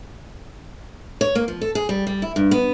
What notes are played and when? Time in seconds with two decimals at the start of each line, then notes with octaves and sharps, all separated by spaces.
1.21 C#5
1.35 A#3
1.48 F3
1.61 A4
1.75 G#4
1.89 G3
2.07 G3
2.22 E4
2.36 G2
2.51 B3